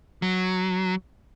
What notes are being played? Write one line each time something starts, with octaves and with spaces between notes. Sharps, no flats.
F#3